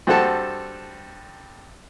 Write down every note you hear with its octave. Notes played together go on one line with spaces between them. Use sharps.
G2 C4 F#4 A4 A5